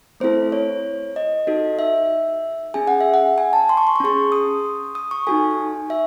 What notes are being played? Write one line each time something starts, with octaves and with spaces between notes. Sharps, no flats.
A3 C4 E4 A4 C5
C#5
D#5
D#4 F#4 A4
E5
C#4 G#4 G#5
F#5
E5
F#5
G#5
A5
C6
C#6
C6
C#6
C#4 G#4 C6
D#6
D#6
C#6
D#4 F#4 A4 G#5
E5